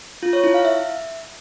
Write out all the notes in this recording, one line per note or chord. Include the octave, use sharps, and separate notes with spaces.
F4
C#5
E4
F5
E5